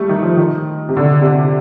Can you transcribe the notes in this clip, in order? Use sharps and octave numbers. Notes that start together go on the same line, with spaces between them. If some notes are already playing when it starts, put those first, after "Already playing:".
Already playing: G3 A3
D#3
F3
D#3
C3
D3
C3
D3